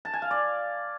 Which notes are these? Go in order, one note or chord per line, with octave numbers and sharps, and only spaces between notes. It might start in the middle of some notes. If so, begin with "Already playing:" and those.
A5
G#5
F5
D5